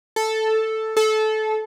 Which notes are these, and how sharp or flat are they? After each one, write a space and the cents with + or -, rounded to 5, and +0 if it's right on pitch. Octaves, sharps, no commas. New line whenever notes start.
A4 +0
A4 -20